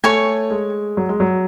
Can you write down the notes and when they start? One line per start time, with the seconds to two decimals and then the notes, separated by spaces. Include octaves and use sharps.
0.04 A3 C#5 G#5 C#6
0.51 G#3
0.97 F#3
1.09 G#3
1.20 F#3